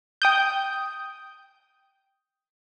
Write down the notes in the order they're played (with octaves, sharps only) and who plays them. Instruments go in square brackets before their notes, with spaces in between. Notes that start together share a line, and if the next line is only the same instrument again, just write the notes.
[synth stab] G5 D#6 G6